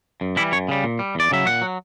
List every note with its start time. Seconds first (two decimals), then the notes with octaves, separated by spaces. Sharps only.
0.21 F#2
0.36 E3 G3 E4
0.52 F#2 C#5
0.69 C#3 G3
0.84 A#2
0.99 G3
1.15 E2 D5
1.31 C#3 F#3 E5
1.46 A#2 F#5
1.62 F#3